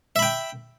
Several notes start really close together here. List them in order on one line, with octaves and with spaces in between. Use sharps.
E5 B5 G5